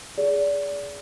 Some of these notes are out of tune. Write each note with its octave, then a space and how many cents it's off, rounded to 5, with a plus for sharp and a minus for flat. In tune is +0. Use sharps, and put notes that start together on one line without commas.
G#4 +0 D5 -30